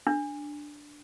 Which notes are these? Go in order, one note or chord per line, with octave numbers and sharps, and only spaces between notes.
D4